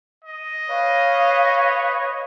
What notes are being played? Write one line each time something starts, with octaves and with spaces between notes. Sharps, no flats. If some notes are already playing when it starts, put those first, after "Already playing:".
D#5
B4 C#5 F5